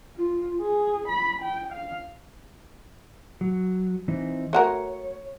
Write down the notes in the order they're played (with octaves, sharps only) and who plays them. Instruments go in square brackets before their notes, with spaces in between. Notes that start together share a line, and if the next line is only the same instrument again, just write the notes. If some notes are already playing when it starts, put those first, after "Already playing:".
[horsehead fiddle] F4
G#4
B5
G5
F5
[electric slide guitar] F#3
E3 C4 D#4
[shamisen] A3 F#4 A#4 [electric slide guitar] C#5